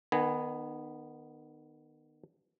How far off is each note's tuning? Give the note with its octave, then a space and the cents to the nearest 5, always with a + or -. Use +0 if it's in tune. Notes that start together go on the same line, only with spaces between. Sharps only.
D#3 -30 B3 +0 G#5 +0